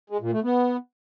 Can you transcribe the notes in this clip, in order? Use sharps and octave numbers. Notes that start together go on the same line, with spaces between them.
G#3
A#2
A3
B3